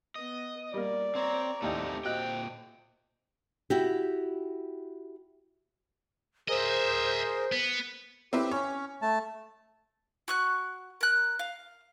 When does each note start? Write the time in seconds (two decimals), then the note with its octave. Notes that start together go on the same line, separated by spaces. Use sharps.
0.16 B3 D#5
0.74 G3 A#3 A#4 D5
1.15 C4 C#5 A#5
1.62 A1 D#2 A3 C4 D#4 G4
2.05 A#2 C4 F#4 D#5 G5 F#6
3.70 E4 F#4 G4
6.48 G#4 A#4 C5 D#5 E5
7.52 B3
8.33 C4 E4 G4 B4
8.51 C#4 C#5
9.02 A3 A5
10.28 F#4 C#6 F#6
11.01 A#4 F#6
11.39 F5